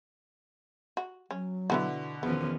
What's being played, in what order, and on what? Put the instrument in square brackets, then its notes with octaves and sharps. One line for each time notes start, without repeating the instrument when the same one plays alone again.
[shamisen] F#4
[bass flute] F#3 [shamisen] C#4
[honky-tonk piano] B2 D3 [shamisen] E3 B3 F#4
[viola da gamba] E2 F3 C#4 [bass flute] D#3 [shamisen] B3